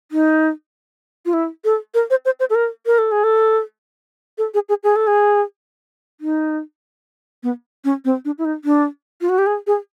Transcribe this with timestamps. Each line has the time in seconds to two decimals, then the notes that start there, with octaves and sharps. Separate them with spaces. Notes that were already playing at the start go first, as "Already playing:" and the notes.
0.12 D#4
1.26 F4
1.33 E4
1.64 A4
1.94 A#4
2.10 C5
2.25 C5
2.40 C5
2.50 A4
2.55 A#4
2.86 A#4
2.98 A4
3.12 G#4
3.24 A4
4.38 A4
4.54 G#4
4.69 G#4
4.84 G#4
4.96 A4
5.07 G#4
6.21 D#4
7.43 B3
7.85 C#4
8.05 C4
8.25 D4
8.38 E4
8.45 D#4
8.65 D4
9.21 F4
9.29 F#4
9.38 G4
9.46 G#4
9.67 G#4